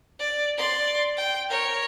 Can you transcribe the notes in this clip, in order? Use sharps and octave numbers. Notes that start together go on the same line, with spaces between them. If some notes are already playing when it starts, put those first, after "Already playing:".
D5
D5 C6
G5
A#4 C#5